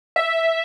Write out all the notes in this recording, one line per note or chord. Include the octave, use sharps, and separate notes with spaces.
E5